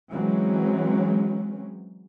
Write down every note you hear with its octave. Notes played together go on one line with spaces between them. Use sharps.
E3 F#3 G#3 C4 C#4